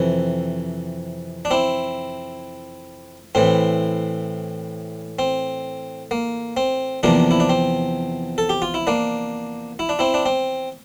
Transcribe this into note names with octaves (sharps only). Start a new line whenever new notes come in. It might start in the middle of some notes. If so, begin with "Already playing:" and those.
Already playing: F2 C3 E3
D4
C4 E4
A2 E3 C4
C4
A#3
C4
E2 C3 F3 A#3 D4
E4
D4
C4
A4
G4
F4
E4
A#3 D4
E4
D4
C4 E4
D4
C4